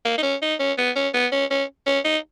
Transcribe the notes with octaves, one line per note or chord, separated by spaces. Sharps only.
A#3
D#4
C#4
D#4
C#4
B3
C#4
B3
C#4
C#4
C#4
D#4